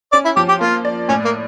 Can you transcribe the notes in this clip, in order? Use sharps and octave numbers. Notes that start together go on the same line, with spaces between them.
C#4 D5
E4
F3 G4
G4
A#3 F4
D5
A2 C#4
A#3